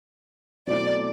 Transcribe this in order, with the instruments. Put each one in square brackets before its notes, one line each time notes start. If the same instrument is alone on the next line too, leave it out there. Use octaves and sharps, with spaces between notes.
[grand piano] B2 F#3 A3 C4 E4 [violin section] D5